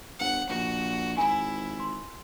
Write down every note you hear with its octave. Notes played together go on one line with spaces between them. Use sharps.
G1 F#5
A#1 F#4
G#1 E4 G#5
C6